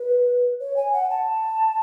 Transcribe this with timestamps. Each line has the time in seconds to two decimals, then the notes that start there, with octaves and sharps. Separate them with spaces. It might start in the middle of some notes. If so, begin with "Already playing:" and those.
Already playing: B4
0.60 C#5
0.77 G#5
0.93 F#5
1.10 A5